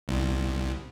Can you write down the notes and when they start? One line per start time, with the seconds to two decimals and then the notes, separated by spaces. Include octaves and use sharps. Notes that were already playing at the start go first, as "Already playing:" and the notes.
0.08 C2